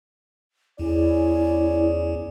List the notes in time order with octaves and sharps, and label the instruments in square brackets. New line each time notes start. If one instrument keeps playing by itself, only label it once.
[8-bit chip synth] E2 [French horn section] C#4 G#4 D5 [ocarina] E4